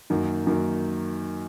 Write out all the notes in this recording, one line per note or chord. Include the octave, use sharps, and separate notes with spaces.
F#2 D#3 F#3 A#3
F#2 D#3 F#3 A#3